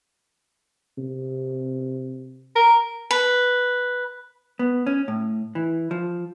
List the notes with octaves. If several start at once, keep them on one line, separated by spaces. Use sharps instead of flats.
C3
A#4
B4
B3
C#4
A2
E3
F3